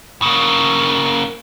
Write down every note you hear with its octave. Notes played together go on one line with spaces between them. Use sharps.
C#3 A#3